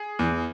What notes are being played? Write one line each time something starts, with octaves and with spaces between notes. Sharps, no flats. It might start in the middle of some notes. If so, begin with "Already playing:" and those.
Already playing: G#4
E2